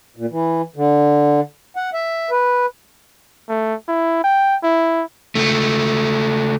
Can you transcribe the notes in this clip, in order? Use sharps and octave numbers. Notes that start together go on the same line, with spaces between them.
A#2
E3
D3
F#5
E5
B4
A3
E4
G5
E4
C#2 A3